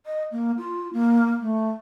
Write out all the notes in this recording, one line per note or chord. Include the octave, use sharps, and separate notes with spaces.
D#5
A#3
F4
A#3
A3